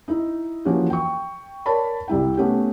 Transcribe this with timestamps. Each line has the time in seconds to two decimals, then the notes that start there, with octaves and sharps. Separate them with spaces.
0.08 D#4 E4
0.65 E3 F3 A#3 C#4 F#4 G4
0.90 G5 C#6
1.66 A#4 C#5 D5 A5 B5
2.08 C2 G3 E4 G5
2.37 A3 B3 C#4 G4